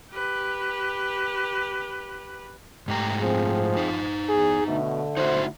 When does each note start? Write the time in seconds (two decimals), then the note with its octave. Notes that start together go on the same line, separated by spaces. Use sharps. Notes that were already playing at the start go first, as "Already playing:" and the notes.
0.11 G4 B4
2.88 G#2 A3 G4 A#5
3.21 F3 C4 G#4
3.77 D#4 C5
4.29 E2 G#4
4.67 B2 D3 A3
5.17 D#4 E4 F#4 C5